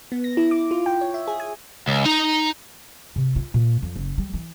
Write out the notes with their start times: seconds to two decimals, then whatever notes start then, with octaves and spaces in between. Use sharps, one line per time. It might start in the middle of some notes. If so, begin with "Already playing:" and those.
0.12 B3
0.24 A#6
0.37 E4
0.51 D6
0.71 F4
0.86 G5
1.01 C#5
1.14 E5
1.28 G#4
1.40 G#5
1.87 C#2
2.06 D#4 A#5
3.16 C3
3.36 F4
3.54 A#2
3.82 F2
3.96 F#1
4.18 G3
4.34 E3